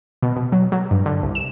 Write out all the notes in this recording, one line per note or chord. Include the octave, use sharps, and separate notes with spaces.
B2
B2
F#3
F#3
G2
D3
C2
E7